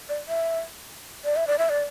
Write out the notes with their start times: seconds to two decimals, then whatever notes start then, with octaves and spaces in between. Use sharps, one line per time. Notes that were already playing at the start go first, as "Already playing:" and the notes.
0.09 D5
0.29 E5
1.25 D5
1.36 E5
1.47 D5
1.59 E5
1.69 D5